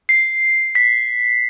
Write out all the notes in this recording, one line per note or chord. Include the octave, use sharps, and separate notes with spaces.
C7
B6